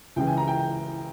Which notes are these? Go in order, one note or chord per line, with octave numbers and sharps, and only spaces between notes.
C#2 C#3 E3 G5
G#5
A#5
G5